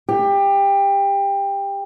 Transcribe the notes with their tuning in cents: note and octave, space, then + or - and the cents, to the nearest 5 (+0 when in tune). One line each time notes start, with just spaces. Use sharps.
G4 +20